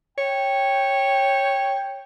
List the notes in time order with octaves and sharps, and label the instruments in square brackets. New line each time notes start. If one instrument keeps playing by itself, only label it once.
[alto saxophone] C#5 [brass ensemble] G5